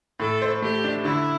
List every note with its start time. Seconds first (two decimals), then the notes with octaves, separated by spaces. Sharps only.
0.20 A2 A4
0.42 C5
0.62 A3 G4
0.84 D4
1.04 D3 E4